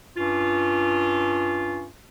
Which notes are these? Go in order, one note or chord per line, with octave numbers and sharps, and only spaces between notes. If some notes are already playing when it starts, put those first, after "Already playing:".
G2 C#4 F4